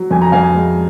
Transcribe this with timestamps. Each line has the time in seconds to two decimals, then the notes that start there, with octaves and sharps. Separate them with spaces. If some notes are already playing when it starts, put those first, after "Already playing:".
Already playing: F#3
0.11 F2 G#5
0.22 A#5
0.32 F2 F5 G#5
0.55 G#3